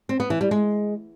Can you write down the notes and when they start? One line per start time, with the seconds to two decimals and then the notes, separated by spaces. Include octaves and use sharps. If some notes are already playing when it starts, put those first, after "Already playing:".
0.09 C4
0.20 B3
0.30 E3
0.41 G3
0.51 G#3